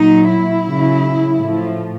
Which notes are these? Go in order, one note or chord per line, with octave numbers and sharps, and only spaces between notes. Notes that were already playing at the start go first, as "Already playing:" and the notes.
Already playing: A#2 F#3 D#4
E4
C#3 F#3
A2 F3